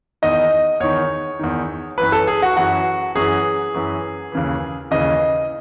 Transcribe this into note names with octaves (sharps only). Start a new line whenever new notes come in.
E2 D#3 D#5
E2 D#3 C#5
E2 D#3
F#2 E3 B4
A4
G#4
F#4
F#2 E3 F#4
F#2 E3 G#4
F#2 E3
D#2 C#3 E3
D#2 C#3 E3 D#5